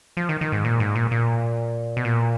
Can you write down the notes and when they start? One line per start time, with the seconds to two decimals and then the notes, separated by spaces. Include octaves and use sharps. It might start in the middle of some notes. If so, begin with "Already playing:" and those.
0.17 F3
0.29 D#3
0.41 D#3
0.52 G#2
0.65 A#2
0.80 G#2
0.95 A#2
1.11 A#2
1.97 B2
2.05 A#2